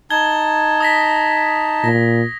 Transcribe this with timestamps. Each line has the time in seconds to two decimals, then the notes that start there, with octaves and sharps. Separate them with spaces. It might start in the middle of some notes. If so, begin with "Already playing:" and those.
0.10 D#4 A5 G#6 G7
0.80 D#6 A#6 B6
1.84 A#2 A#6